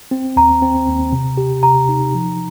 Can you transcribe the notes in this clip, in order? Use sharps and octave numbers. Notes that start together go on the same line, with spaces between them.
C4
D#2 A#5
C4
D#2
C3
G4
C3 A#5
D#4
F3